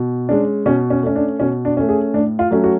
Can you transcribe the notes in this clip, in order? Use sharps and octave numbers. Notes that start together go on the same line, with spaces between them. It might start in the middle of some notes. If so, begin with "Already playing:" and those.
Already playing: B2
G#3 C#4 D4
B2 C#4
C#4
A3 C#4
D4
B2 C#4
D4
A3 C#4
G#4
A2 D4
F4
F#3 A3 C#4
F#4